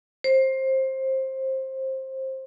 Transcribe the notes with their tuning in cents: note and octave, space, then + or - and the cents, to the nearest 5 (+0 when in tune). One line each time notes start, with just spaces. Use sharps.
C5 +20